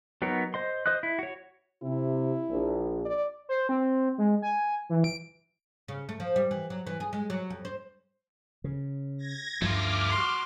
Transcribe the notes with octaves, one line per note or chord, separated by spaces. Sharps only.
F#3 B3 D#4 A#4 C#5
C5 D#5 C6
C5 D#5 D#6 F#6
E4
F#4 C#5
C3 E4
A#1
D5
C5
C4
G#3
G#5
E3
D7
C#3
A3
F3
G3
E3
F#3
E3
G#4
G#3
F#3
F2
C5
C#3
G#6 A#6
D2 G2 F3 A3 F4 D6 F6
F#4 C6